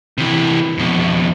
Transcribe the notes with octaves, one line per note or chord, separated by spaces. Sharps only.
C3 E3
F2 B2